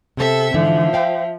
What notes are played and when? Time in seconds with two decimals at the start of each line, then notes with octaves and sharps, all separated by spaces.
0.17 C3 C4 A4 E5
0.54 G#2 D3 E3 F3 E5
0.93 C5 F5 G5